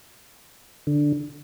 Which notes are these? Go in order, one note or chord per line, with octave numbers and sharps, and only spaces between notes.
D3